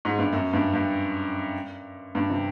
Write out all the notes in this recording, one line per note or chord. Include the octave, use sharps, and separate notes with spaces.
G#2
G2
F#2
G2
G2
G2
C3